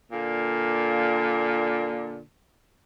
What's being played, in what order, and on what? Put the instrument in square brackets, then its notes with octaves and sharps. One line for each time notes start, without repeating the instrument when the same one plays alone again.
[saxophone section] A#2 D3 A#3